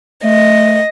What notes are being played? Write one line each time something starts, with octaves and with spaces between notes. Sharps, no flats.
A3 D#5